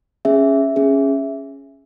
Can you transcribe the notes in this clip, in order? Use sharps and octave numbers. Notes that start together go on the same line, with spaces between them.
C#4 G#4 E5
C#4 G#4